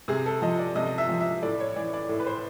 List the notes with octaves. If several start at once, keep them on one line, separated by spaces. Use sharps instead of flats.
C3 G#4
A4
F3 D#5
D5
C3 D#5
E5
F3
E5
A2 D5
C#5
E3 D5
D5
A2
B4
C5